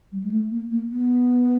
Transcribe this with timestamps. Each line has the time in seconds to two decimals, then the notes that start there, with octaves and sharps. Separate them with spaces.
0.12 G3
0.24 G#3
0.31 A3
0.51 A#3
0.71 A#3
0.90 B3